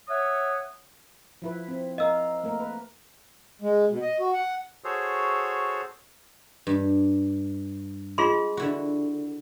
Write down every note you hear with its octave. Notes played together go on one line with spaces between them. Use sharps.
C#5 E5 F#5 D#6
F3 E4 B4
C4
A#4 D#5 F5 E6
A3 A#3 A#4
B4
G#3
B2
D#5
F#4
F#5
F#4 G#4 A4 C5 C#5
G2
G#3 F4 G#4 C6
D3 E4 F#4